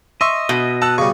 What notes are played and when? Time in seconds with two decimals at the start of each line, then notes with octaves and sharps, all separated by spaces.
0.21 D#5 E5 C6 C#6 E6
0.49 B2
0.82 F#5 A5 E6 F#6
0.98 C#3 G3 C#6